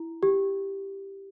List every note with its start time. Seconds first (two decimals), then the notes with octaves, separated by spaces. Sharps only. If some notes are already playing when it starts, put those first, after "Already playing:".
Already playing: E4
0.23 G4